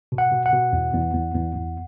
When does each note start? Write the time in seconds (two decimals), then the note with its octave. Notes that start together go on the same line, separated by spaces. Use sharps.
0.12 B2
0.18 F#5
0.32 B2
0.46 F#5
0.53 B2
0.73 E2
0.94 E2
1.14 E2
1.34 E2
1.55 E2